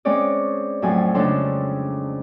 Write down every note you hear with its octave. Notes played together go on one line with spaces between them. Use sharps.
G#3 C4 C#4 C#5 D5
F2 A2 F#3 G#5
C#3 G#3 C#4 D4 A4 C6